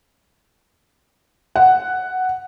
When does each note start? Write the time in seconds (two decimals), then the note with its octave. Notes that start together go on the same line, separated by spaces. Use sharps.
1.56 F#5